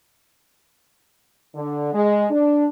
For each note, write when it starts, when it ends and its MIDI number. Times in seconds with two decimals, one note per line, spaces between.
1.56 1.92 50
1.93 2.25 56
2.31 2.67 62